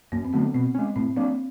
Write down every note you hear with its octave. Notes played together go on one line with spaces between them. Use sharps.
F#2 A#3
C4
D3 F#3 A3 B3
B2 C4
G#3 C#4
A2 C4
F#3 A#3 C4 D4